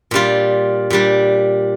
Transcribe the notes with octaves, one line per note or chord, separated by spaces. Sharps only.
A#2 G3 D4 F4
A#2 G3 D4